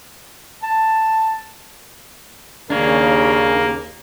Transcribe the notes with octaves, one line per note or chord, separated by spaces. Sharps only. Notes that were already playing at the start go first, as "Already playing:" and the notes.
A5
D#2 C#3 A#3 D4 C#5